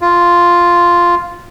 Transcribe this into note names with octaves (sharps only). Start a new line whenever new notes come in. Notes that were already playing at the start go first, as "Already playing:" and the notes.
F4